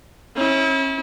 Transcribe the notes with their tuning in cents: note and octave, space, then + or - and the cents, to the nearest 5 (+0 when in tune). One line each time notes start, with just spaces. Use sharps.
C#4 -35 E4 -35